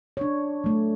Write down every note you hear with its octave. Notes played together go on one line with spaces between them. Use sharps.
D4 C#5
F#3 A3